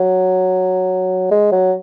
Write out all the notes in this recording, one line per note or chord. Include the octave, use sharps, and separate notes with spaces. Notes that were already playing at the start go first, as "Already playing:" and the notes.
Already playing: F#3
G#3
F#3